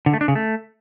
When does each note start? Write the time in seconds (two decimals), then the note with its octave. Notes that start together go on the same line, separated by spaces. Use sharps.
0.06 D3
0.14 A3
0.21 D4
0.28 C#3
0.35 A3